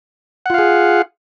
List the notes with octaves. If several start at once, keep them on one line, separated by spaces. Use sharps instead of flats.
F4 G#4 F5 F#5